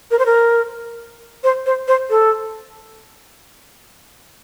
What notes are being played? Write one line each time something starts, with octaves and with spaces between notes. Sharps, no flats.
A#4
C5
A#4
C5
C5
C5
A4